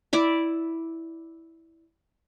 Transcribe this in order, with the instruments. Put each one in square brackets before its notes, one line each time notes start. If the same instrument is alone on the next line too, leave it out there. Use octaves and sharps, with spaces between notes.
[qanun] E4 D5 E5